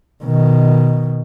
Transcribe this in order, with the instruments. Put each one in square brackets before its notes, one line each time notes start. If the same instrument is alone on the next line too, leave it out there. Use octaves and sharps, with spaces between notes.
[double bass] B2 D#3